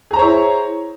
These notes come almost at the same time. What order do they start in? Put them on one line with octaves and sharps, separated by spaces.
G#4 A#5 C5 C#5 E4